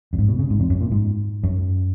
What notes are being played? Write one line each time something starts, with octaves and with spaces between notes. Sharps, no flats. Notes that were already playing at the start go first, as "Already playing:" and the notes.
F#2
G#2
B2
C#3
G#2
F2
F#2
A#2
G#2
F#2